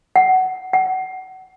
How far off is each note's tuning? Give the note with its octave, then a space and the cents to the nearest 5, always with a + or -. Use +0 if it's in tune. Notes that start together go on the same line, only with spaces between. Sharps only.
F#5 +15
F#5 +25